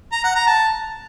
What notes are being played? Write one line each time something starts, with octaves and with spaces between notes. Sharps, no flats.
A#5
F#5
A#5
A5